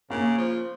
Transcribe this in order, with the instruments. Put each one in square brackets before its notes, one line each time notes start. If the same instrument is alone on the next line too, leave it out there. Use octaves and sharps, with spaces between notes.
[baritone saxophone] C#3 [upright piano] A#3
[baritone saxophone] F3